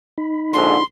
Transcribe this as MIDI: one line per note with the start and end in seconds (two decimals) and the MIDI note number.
0.18 0.83 63
0.18 0.83 83
0.53 0.76 34
0.53 0.76 44
0.53 0.76 50
0.53 0.84 84